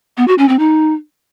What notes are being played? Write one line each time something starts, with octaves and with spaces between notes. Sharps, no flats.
B3
F#4
C#4
C4
D#4